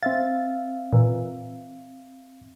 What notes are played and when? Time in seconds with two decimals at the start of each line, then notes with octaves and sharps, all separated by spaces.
0.03 C4 E5 F5 A6
0.93 A#2 E3